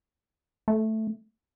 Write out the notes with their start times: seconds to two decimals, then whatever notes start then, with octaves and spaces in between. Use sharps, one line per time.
0.68 A3